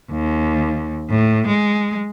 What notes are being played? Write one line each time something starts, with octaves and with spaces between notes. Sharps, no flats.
D#2
A2
G#3